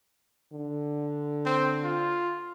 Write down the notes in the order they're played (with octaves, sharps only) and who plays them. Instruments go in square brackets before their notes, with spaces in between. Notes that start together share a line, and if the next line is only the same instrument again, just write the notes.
[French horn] D3
[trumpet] C4
F4